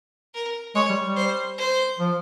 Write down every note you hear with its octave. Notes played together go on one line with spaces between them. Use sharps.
A#4
G#3 C#5
G3
G3
C5
C5
F3